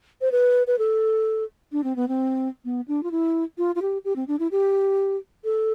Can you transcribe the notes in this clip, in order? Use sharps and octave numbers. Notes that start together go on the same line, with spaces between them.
C5
B4
B4
A4
D4
C4
B3
C4
B3
D4
F4
E4
F4
F4
G4
G4
C4
D4
E4
G4
A4